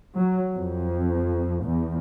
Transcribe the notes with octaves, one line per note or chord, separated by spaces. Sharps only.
F#3
F2
E2